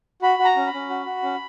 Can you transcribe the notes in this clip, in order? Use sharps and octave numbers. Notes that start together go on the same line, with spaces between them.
F#4 B5
F#4
A#5
C#4
B5
C#4
F#4
F#4
C#4